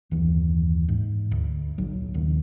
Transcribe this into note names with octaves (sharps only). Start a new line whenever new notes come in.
F#1 D#2 E3
G#2
D2
A#1 F#3
A#1 D#2 D#3